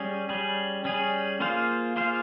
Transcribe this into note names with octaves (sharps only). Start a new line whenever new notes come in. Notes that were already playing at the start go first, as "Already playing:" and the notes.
Already playing: G3 C#4 G#4
G3 C#4 G#4
G3 C#4 G#4
A#3 F4 G#4 C5 F5
A#3 F4 G#4 C5 F5